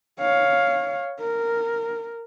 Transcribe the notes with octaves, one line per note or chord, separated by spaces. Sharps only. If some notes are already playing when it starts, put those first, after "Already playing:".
C#5 F5
A#4